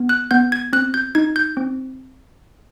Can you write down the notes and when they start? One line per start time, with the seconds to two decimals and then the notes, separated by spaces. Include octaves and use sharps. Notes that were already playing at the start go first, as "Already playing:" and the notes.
Already playing: B3
0.09 F#6
0.31 B3 G6
0.52 G#6
0.73 C4 F#6
0.94 G6
1.15 D#4 G#6
1.36 G6
1.57 C4